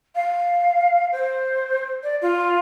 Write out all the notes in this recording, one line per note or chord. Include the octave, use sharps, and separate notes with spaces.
F5
C5
D5
F4